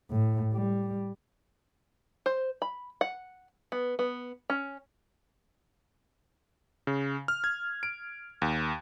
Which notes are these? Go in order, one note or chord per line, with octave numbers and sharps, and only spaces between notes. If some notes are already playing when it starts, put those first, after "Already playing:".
A2
G3
C5
B5
F#5
B3
B3
C#4
C#3
F6
G#6
D7
D#2